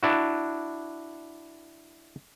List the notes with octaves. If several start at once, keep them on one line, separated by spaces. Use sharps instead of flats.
D4 E4 F#4